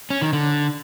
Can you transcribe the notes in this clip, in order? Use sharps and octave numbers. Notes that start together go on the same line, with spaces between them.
C#4
D#3
D3